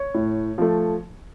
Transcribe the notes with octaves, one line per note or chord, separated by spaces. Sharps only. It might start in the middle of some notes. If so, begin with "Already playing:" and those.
Already playing: C#5
A2
F3 A3